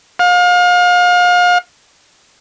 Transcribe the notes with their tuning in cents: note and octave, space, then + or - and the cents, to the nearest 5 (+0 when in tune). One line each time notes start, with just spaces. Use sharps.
F5 +35